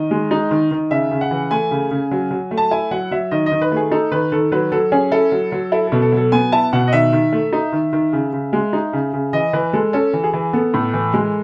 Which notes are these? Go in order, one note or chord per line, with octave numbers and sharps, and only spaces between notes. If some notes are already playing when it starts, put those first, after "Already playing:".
Already playing: D#3 D#5
G#3
D#4
D#3
D#3
C#3 E5
C#3
F#5
E3
A3 G#5
C#3
C#3
F#3
F#3
A3
A5
E4 G#5
F#3 F#5
F#3 E5
D#3 D#5
D#5
D#3
B4
A3 G#4
D#4 A4
D#3 B4
D#3 A4
F#3 B4
F#3 A4
C#4 G#4
E4 A4
F#3
F#3
E4 A4
B2 A4
A4
F#3 A4
B3 G#5
E4 A5
B2 F#5
D#5
D#3 E5
D#3
A3
D#4
D#3
D#3
C#3
C#3
G#3
D#4
C#3
C#3
E3 D#5
E3 B4
G#3 A4
C#4 A4
E3
G#4
E3
B3 A4
A2
E3
G#3